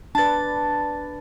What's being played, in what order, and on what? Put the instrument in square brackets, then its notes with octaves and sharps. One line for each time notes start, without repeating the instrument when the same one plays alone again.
[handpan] D4 B4 [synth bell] A5 A6